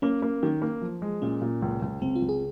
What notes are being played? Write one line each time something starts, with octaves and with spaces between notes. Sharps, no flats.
A#3 C#4
A#3
D#3 C#4
A#3
F3
G#3
A#2 C#4
A#2
C#2
C#2
C#2 C4
F4
C#2
G#4